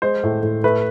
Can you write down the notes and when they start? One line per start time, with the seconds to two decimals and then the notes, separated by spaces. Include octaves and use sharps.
0.02 G#3 C5
0.23 A2
0.43 A2
0.64 A3 B4